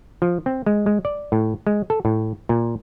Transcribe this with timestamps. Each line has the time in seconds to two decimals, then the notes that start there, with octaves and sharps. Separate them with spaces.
0.22 F3
0.46 C4
0.66 G#3
0.86 G#3
1.05 D5
1.32 A2
1.67 G#3
1.90 A4
2.05 A2
2.49 A#2